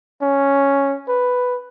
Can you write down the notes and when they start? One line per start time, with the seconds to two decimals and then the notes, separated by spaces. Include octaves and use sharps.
0.22 C#4
1.08 B4